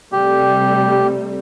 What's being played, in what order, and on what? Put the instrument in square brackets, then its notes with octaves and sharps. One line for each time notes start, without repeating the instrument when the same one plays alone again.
[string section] C3 G3 A3 [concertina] G4